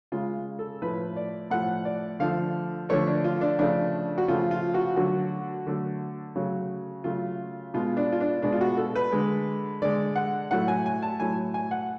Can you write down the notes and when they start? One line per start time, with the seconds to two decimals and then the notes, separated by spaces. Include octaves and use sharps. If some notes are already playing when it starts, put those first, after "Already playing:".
0.12 C#3 G#3 F4
0.59 A4
0.82 A2 F3 A3 B4
1.16 D5
1.50 A2 F3 A3 F#5
1.85 D5
2.20 D3 F3 A3 F5
2.89 D3 F3 A3 C#5
3.07 D4
3.24 F4
3.41 D4
3.59 C#3 F3 A3 D4
4.18 F#4
4.28 C#3 F3 A3 F4
4.51 F4
4.74 F#4
4.96 D3 F#3 A3 F#4
5.67 D3 F#3 A3
6.36 C#3 F#3 A3
7.04 C#3 F#3 A3 F4
7.74 B2 G#3 F4
7.97 D4
8.12 F4
8.20 D4
8.42 B2 G#3 D4
8.52 F4
8.61 F#4
8.77 A4
8.95 B4
9.12 D3 G#3
9.82 D3 G#3 D5
10.16 F#5
10.51 A2 F#3 A3 F#5
10.68 G#5
10.86 G#5
11.02 A5
11.20 A2 F#3 A3 G#5
11.54 G#5
11.71 F#5